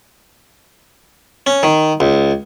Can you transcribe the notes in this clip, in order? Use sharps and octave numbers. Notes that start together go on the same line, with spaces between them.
C#4
D#3
C#2